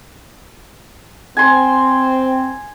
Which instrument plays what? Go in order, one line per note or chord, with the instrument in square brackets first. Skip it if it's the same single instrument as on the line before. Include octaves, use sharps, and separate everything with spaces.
[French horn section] C4 [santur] G#5 C6